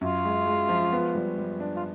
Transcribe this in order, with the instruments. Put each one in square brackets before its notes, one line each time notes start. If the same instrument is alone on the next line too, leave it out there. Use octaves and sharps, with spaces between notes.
[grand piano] F#2 [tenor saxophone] F4
[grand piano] G#3
G#3
F3
B3
G3
G3
D4
[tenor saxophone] F4